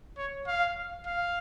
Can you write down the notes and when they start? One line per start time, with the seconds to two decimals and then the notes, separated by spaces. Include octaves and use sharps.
0.18 C#5
0.47 F5
1.06 F5